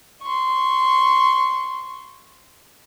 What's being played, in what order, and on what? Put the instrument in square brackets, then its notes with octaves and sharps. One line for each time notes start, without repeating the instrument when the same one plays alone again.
[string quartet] C6 C#6